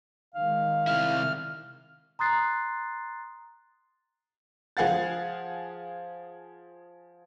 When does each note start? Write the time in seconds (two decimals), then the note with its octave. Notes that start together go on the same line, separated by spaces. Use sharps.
0.34 D#3 G#3 F5
0.87 C3 E4 F6
2.19 A#5 C6 D#6 F#6 A6 C7
4.77 F3 G#4 F5 F#5 A6